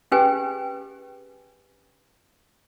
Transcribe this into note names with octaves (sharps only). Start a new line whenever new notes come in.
C#4 G4 G#4 B4 G5 G#5